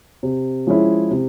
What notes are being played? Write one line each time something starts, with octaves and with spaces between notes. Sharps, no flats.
C3
F3 G#3 C#4 E4
C3